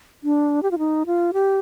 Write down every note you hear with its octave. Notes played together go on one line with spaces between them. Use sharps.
D4
G4
F4
D#4
F4
G4